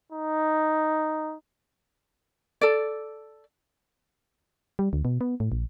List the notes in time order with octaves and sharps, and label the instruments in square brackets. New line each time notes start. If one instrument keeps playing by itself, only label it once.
[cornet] D#4
[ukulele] A4 D5
[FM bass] G3
D2
B2
B3
A2
A#1